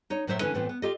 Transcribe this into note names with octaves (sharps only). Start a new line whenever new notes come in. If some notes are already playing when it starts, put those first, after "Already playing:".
D#4 C#5
A2 F#3 A#3 C5 C#5 E5
D3 E3 C#4 E4 B4
A2 E3 B3 C4 F4
B3
F4 G4 A4 D#5